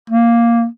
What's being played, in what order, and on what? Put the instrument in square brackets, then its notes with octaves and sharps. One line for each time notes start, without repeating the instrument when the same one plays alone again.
[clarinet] A#3